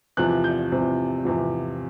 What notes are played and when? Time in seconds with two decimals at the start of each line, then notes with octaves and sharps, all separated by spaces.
0.17 E2 C3 F3 F#6
0.44 G6
0.72 E2 C3 F3
1.25 E2 C3 F3